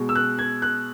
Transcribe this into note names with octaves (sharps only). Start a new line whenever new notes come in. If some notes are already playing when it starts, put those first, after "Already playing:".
Already playing: B2 G#3
E6
F#6
G#6
F#6